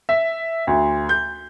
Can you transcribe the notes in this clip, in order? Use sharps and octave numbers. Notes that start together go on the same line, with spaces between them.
E5
D2
G6